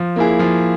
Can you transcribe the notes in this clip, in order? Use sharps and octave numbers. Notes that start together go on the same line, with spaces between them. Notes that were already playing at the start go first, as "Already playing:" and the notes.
Already playing: F3
A#3 E4 G#4
F3